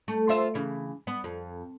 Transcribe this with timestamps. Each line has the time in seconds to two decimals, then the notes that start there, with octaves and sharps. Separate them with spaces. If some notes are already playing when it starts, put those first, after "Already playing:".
0.08 A3
0.29 F4 C5 E5
0.55 C#3 E3
1.07 B3
1.24 F2